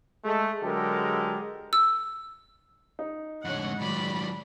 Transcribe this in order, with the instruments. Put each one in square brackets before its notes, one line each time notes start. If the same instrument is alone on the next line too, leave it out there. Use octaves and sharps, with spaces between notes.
[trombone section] G#3 A3
D3 F#3 G#3 G4 A4 A#4
[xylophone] E6
[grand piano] D#4
[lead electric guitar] F2 D3 [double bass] A2 G#3 [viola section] C#5 F#5
[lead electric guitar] D#3 F#3 [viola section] D5 B5